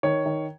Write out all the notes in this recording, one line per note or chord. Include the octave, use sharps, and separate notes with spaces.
D#3 C#5
D#3